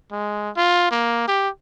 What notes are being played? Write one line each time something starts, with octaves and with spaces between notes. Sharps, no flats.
G#3
F4
A#3
G4